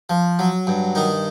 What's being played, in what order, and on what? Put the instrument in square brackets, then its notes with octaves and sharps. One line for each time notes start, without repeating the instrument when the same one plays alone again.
[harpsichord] F3
F#3
G2
D#3 D#4